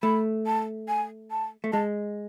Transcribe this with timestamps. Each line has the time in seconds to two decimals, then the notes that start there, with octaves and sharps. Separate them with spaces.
0.03 A3 B5
0.46 A5
0.88 G#5
1.31 A5
1.64 A3
1.72 G#3 A5